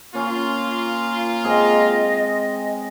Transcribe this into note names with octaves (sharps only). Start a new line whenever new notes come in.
A#3 C#4 F4
G#3 C4 G#4 D#5